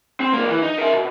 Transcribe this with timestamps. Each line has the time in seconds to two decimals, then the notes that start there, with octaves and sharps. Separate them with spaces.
0.20 C4
0.34 B1 A#3
0.50 E3
0.62 D#4
0.78 A#4 E5
0.94 B2